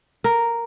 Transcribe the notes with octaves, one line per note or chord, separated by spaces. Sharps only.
A#4